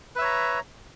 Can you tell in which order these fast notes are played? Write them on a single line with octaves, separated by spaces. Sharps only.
B4 E5 C#5 A#5